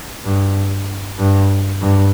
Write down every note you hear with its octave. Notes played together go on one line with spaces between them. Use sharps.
G2
G2
G2